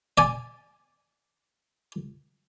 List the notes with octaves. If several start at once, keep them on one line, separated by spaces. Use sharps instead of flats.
D5 G#5